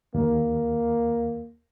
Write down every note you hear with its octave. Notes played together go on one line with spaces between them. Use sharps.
D#2 A#3